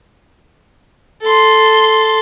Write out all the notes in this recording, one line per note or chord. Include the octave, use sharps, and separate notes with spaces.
A4 C6